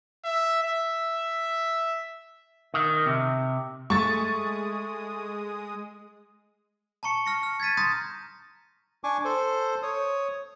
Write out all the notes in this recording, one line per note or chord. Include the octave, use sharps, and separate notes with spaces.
E5
E5
D#3
C3
G#3 A3 C#6 D#6 A6
A5 A#5 C#6 C#7
F6 A#6 C#7
F6
G#6 A6 B6 D#7
A#5 C6 D#6 G6 A6 A#6
D4 G#5 C#6 D6
A4 C5
C#5 D#6